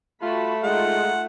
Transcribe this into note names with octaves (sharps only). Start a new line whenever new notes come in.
A3 F4 F#4 A5 B5
G#3 D#4 F4 F#5